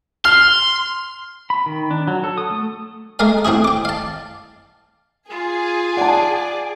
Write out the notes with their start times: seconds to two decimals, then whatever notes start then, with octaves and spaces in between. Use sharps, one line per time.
0.25 C6 F6
1.50 B5
1.66 D#3
1.91 D4
2.08 F#3
2.24 A4
2.38 D#6
2.51 A3
3.19 G#3 A3 A#4 F5 G#5
3.45 A2 C4 E4 F#4 G#4
3.65 G5 D6
3.85 F5 A5
5.30 F4 G#4
5.97 D5 F#5 A5